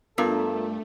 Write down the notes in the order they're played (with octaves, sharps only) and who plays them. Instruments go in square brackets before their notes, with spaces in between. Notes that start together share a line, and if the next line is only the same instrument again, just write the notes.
[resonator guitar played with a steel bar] G2 [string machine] A3 [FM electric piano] B3 F4 A#4 [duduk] A4